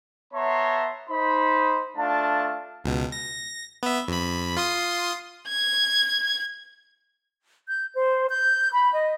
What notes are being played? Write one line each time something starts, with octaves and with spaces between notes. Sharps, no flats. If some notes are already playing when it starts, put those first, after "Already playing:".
B3 C#5 E5 A5 A#5 C6
D#4 C5 B5
A3 D4 F4 F5 A5
C#2 B2
A#6
B3 E5
F2 B5
F4 C6 D#6
G#6
G6
C5
G6
B5
D#5